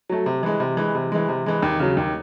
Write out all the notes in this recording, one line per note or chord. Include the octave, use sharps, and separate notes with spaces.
F#3 A3
C3
E3 G#3
C3
E3 G#3
C3
E3 G#3
C3
E3 G#3
D#2
C#3 F#3
D#2